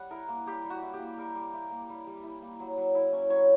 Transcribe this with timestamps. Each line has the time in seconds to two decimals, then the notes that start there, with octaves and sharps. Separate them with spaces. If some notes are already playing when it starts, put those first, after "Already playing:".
Already playing: G3 F#5
0.11 E4 A#4
0.28 A#3
0.46 G3 G4
0.65 G3
0.70 F#4
0.82 E4
0.93 G4
1.00 A#3
1.18 G3 A#4
1.35 G3
1.53 E4
1.71 A#3
1.89 G3
2.07 G3
2.23 E4
2.42 A#3
2.60 F#3
2.77 F#3
2.95 E4
3.13 C#4
3.30 F#3 C#5